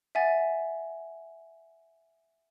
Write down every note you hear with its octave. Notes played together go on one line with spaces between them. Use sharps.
E5 F#5 G#5 A6